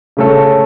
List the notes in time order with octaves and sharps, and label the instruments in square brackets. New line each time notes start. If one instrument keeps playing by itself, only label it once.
[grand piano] C#3 A3 C#4 A4